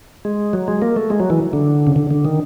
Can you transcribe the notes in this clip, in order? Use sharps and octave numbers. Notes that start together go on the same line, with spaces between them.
G#3
F#3
G#3
A#3
A3
G#3
F#3
E3
D3
C#3
D3
D3
D#3